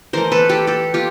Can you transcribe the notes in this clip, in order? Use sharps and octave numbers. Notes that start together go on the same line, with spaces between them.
E3 A3 A#4 C5
A4 B4
G4 A4
G4 A4
F4 G4